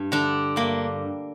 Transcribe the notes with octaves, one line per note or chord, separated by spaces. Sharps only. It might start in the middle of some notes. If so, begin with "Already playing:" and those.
Already playing: G2
D3 D4
G2 A#3